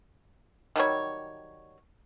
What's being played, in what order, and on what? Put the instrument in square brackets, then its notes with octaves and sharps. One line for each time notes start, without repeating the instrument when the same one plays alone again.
[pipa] D#3 F#3 G3 C#5